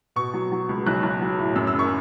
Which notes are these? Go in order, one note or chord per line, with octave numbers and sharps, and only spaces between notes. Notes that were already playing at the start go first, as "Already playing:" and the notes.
B2 C#6
F#3
F#3
C#2
B1 F#6
B1
F#3
A2
F#2 E6
E6
F#1
C#6